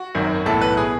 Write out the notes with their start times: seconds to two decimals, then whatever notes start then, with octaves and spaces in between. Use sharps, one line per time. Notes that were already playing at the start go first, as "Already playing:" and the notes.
Already playing: F#4
0.15 G#1 F#2 D#3
0.46 B1 A2 E3 A4
0.61 B4
0.77 B2 G#4